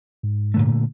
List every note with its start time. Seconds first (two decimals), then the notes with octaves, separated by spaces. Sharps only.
0.23 G#2
0.54 A#2 D3 A3